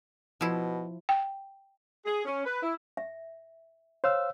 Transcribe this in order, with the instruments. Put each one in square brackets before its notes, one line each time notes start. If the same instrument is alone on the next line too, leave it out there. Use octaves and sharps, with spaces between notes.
[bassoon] B2 [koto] F3 E4
[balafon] G5
[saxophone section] G#4
C#4
B4
E4
[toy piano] E5
[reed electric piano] C5 F5 E6 [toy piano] C#5